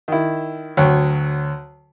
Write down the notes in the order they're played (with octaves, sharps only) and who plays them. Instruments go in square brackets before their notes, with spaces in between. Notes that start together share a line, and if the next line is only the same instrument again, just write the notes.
[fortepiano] D#3 E4
D2 F#3 C#5 G5